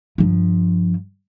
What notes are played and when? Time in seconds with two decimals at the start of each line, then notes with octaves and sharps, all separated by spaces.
0.18 G2 F3